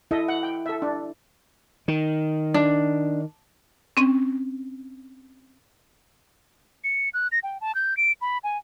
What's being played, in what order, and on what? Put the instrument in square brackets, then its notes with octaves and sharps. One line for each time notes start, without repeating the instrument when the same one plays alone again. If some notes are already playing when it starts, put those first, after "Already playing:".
[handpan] E4 [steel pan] A4 D#5 E5
[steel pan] F#5
G5
A4 E5
D4
[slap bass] D#3
[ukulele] D4
[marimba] C4 C#4
[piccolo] C#7
F#6
A#6
G5
A5
G6
D7
B5
G#5